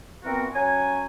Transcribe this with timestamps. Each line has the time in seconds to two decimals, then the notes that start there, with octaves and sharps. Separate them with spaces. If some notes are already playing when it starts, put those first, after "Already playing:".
0.24 A#2 E3 B3 C4 F#4 A#4
0.54 F#3 C#4 F#5 G#5